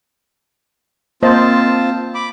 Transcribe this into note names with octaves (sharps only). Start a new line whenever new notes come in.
A#3 C4 F4 C5 D#5 A5
B5 D6